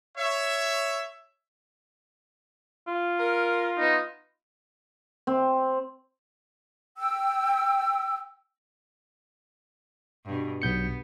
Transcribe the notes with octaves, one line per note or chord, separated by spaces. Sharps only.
C#5 E5
F4
A#4
B3 D#4 D#5
C4
G5 E6
G2 B2
B1 B3 G6 C#7